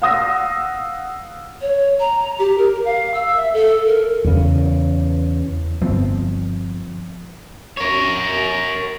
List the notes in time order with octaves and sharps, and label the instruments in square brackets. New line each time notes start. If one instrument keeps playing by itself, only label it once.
[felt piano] F5 F#5 D#6 E6 A#6
[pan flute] C#5
A#5
G4
A#4
F5
E6
E5
A4
A#4
[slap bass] E2 C#3
[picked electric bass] G1 F3 B3 C4
[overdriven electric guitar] A#4 C#5